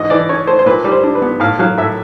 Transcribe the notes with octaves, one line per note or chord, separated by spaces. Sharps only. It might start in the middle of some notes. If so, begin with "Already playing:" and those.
Already playing: G#2 E3 D#5
E3 D5
C#4 C#5
A3 C5
C5
A#2 B4
G3
C5
D4
B4
B3
A2 F5
F#3 F5
A2 E5